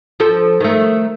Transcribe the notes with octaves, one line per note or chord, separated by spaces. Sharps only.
F3 A4
D#3 A3